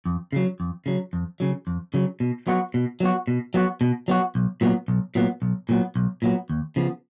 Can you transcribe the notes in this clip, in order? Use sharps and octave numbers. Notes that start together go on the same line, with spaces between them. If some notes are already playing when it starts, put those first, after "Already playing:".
F2
C#3 F#3
F2
C#3 F#3
F2
C#3 F#3
F2
C#3 F#3
B2
F#3 B3 F#4
B2
F#3 B3 F#4
B2
F#3 B3 F#4
B2
F#3 B3 F#4
B1
A#2 F#3 B3
B1
A#2 F#3 B3
B1
A#2 F#3 B3
B1
A#2 F#3 B3
D#2
C#3 F3 B3